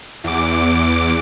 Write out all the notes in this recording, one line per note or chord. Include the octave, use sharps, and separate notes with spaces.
E2 D6